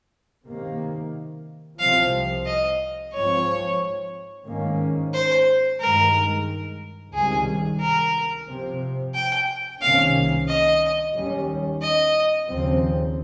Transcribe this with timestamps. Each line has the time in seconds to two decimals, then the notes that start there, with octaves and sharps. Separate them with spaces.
0.46 C3 D#3 A#3
1.79 C2 C3 F3 C4 F5
2.46 D#5
3.13 G#2 F3 C4 C#5
4.46 G#2 D#3 A#3 C#4
5.14 C5
5.80 G2 D#3 G#3 A#4
7.13 C#2 C3 D#3 G3 G#4
7.80 A#4
8.47 C3 F3 C4
9.14 G5
9.81 C2 C3 D#3 A#3 C#4 F5
10.48 D#5
11.15 D#2 D#3 G3 C#4
11.81 D#5
12.48 D#2 C#3 F3 C4